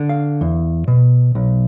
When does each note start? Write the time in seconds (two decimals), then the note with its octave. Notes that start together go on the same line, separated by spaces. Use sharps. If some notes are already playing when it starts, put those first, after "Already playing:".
Already playing: D3
0.09 F5
0.41 E2
0.88 B2
1.35 B1